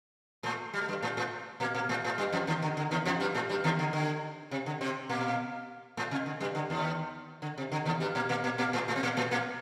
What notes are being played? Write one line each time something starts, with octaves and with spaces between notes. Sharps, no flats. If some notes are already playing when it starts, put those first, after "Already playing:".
A2 A3
G3
A3
G2 G3
A2 A3
A2 A3
A#2 A#3
A#2 A#3
A2 A3
A2 A3
G2 G3
F2 F3
D#2 D#3
D3
D3
D#2 D#3
F2 F3
G2 G3
A2 A3
G2 G3
D#2 D#3
D3
D3
C3
D3
C3 C4
A#2 A#3
A2 A3
C3
D3
G2 G3
D3
D#2 D#3
D3
C3
D3
D#2 D#3
G2 G3
A#2 A#3
A#2 A#3
A#2 A#3
A#2 A#3
A2 A3
A2 A3
C4
A#2 A#3
A2 A3
A#2 A#3